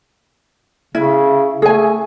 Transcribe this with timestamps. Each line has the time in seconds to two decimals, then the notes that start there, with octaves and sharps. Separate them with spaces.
0.95 C#3 E4
1.62 A3 G#4 G#5